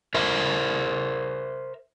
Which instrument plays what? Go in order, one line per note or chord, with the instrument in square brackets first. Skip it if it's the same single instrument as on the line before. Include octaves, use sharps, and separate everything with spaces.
[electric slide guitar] A#4 C5 E5